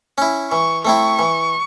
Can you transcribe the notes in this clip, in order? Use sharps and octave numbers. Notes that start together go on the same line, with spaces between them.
C#4 E4
E3 C#6
A3 C4 E4 C#6
E3